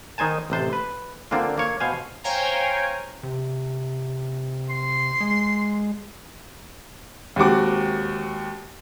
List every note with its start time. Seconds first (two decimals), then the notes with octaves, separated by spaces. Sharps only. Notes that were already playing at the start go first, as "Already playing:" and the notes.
0.18 D#3 D#4 C5 G#5 A5
0.50 A1 C3 C5 A5
0.73 B4
1.31 D3 A#3 C4 D4 F4
1.58 A#3 C#5
1.80 B2 C5 F5 G#5
2.24 C5 C#5 F5 G5 G#5 A#5
3.23 C3
4.70 C6
5.21 G#3
7.36 D#2 G#3 C4 F#4 D6